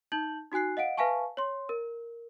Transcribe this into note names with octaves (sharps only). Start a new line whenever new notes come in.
D#4 A5 G6 F#7
D#4 F#4 G#5 F#6 C7
D#5 F5 F#5 D7
B4 E5 F5 G#5 A5 C#6
C#5 C6
A#4